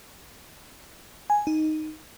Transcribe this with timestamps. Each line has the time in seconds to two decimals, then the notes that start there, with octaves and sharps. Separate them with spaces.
1.30 G#5
1.47 D#4